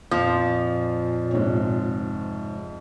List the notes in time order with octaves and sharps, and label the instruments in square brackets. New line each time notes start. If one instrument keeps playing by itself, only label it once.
[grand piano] F2 [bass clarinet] A#2 [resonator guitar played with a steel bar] F3
[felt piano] G#2 C3 C#5